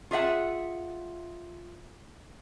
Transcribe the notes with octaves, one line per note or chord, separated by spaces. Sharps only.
F4 G#4 E5 F#5